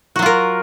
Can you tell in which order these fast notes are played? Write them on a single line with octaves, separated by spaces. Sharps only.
F#4 F#3 F4 A#4